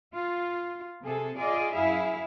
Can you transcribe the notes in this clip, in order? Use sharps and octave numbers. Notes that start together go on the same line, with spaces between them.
F4
C3 G#4 A4
F4 G#4 D5 D#5
F#2 E4 G#4 E5 F5